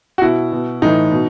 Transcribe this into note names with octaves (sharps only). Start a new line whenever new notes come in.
F#4
B2 E4
B2
A2 E3 D#4
B2